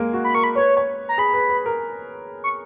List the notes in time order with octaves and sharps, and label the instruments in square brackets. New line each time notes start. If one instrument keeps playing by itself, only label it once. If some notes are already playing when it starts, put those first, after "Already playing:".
Already playing: [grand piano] G#3 A#3
F#4
[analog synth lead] B5
[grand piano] A#4 [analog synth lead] C#6
[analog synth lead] B5
[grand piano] B4 [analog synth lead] C#5
[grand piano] C#5
[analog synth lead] A#5
[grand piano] G#4 [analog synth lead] B5
[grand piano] B4
B4
A#4
[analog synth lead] C#6